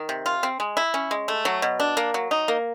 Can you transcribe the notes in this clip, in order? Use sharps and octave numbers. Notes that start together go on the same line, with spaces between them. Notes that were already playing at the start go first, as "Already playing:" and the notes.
Already playing: D#3
C3
F4
C4
G#3
E4
C#4
G#3
A3
F#3
B2
D4
A#3
F#3
D#4
A#3